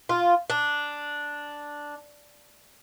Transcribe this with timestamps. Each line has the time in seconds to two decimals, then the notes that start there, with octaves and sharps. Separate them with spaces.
0.09 F4
0.50 D4